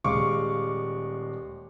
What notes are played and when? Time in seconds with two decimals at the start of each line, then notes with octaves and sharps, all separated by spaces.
0.04 D#1 G#3 F5 C#6 D6